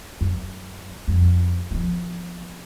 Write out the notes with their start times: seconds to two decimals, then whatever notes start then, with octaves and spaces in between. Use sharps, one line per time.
0.21 F#2
1.08 F2
1.71 F3 B3